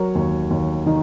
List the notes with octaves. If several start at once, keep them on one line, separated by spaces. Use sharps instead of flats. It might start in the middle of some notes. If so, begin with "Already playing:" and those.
Already playing: F#3 A#4 C#5
D#2
D#2
D#3